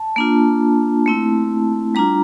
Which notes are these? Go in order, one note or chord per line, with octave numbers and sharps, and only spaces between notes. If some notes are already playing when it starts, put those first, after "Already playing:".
Already playing: A5
A#3 D4 F4
A3 C4 E4
G3 D4 F4 A#5